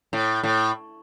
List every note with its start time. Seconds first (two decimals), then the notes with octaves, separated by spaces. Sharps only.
0.13 A2
0.43 A2